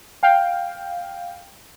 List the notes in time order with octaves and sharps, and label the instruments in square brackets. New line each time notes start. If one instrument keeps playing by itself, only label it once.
[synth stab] F5 G5